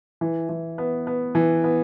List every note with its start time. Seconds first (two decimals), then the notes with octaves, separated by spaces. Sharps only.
0.21 E3
0.49 E3
0.78 B3
1.07 B3
1.35 E3
1.64 B3